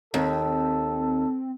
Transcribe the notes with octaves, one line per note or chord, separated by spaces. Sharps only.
D#2 C4 A4